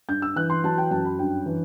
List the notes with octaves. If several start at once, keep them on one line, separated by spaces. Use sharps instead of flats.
G2 G6
E6
E3 F#6
C6
F#3 A5
G5
F#2 A5
B5
G2 G5
E3